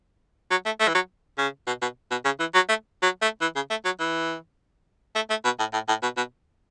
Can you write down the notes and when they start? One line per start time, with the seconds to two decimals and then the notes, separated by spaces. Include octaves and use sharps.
0.51 F#3
0.66 A3
0.80 A3
0.88 E3
0.95 F#3
1.38 C#3
1.67 B2
1.82 B2
2.11 B2
2.25 C#3
2.40 E3
2.55 F#3
2.69 A3
3.03 F#3
3.22 A3
3.41 E3
3.56 C#3
3.70 A3
3.85 F#3
4.00 E3
5.16 A3
5.30 A3
5.45 B2
5.59 A2
5.73 A2
5.89 A2
6.03 B2
6.17 B2